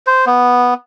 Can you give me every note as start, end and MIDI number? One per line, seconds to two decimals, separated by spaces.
0.07 0.25 72
0.27 0.74 59